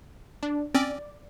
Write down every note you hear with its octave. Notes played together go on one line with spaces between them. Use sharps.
D4
C4 C#4 D5